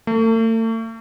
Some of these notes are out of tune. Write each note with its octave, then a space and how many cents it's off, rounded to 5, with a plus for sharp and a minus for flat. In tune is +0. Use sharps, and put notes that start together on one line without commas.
A3 +40